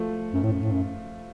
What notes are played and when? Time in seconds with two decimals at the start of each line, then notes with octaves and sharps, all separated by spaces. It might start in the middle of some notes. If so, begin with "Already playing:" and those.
Already playing: F3 A3
0.33 F#2
0.43 A2
0.52 F#2
0.62 A2
0.71 F#2